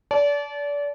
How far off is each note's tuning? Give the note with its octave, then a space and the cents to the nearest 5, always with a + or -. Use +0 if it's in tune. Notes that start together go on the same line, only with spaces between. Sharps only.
D5 -30 A5 -25